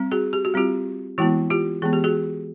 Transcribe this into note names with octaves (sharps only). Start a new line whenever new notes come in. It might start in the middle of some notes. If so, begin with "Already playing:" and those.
Already playing: G3 C4
F#4 G#4
G4
F#4
G3 C4 F4 G4
E3 G#3 B3 E4 F#4
F4 G4
E3 G#3 B3 G#4
G4
F#4 G#4